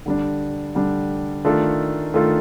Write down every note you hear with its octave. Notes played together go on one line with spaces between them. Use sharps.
D3 G3 D4
D3 G3 D4
D#3 A3 D4 F4 A4
D#3 A3 D4 F4 A4